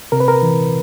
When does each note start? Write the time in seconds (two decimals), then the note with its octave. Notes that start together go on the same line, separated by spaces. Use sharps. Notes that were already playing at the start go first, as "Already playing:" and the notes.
0.12 C3 A#4
0.20 B4
0.28 A#4
0.42 E3